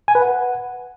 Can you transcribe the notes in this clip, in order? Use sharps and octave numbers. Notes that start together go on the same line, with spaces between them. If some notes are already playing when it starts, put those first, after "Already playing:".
G#5
B4
F#5